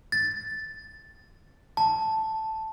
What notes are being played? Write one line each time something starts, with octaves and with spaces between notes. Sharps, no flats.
A6
A5